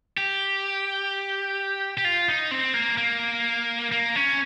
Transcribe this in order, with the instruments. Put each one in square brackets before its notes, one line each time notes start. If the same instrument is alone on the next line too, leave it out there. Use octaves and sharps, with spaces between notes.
[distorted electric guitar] G4
G4
F4
D#4
C4
A#3
A#3
A#3
C#4